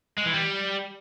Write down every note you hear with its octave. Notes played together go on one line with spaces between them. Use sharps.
G#3
E3
G3